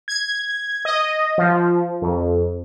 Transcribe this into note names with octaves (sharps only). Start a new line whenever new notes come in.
G#6
D#5
F3
F2